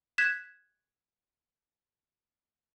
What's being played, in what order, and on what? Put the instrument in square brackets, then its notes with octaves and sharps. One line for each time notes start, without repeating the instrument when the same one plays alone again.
[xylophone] F#6 G#6 B6 E7